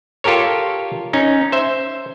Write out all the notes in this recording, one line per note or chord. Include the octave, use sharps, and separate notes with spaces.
F4 G4 A4 A#4 C#5
C#4 D#4
C5 E5